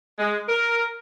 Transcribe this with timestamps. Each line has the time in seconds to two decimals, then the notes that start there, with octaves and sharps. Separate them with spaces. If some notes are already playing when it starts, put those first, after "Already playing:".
0.19 G#3
0.49 A#4